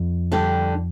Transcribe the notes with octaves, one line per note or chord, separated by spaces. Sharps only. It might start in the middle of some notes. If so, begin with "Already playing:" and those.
Already playing: F2
D3 G3 D4 G4